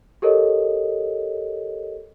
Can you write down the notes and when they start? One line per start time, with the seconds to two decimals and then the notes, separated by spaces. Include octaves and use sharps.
0.22 G4 A4 A#4 C#5 D#5